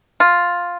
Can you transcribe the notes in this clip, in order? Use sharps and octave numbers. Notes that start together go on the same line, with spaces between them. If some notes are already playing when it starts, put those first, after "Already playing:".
F4